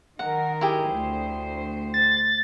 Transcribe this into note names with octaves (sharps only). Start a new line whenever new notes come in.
D#3 A#4 F#5
E4 G4 G#4
D2 C5
A6